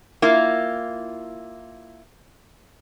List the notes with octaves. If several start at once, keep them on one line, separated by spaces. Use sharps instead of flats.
A#3 E4 F4